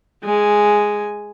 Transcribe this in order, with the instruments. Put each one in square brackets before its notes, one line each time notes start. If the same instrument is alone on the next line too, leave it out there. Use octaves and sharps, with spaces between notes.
[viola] G#3 G#5